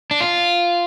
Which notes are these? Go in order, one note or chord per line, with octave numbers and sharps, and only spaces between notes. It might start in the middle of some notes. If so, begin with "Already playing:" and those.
D4
F4